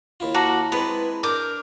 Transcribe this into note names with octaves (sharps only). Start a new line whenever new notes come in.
D#2 E4 F4
A#3 F#4 A5 A#5 A#6
G#3 B3 C4 E4 B4
D4 A#4 D6 G6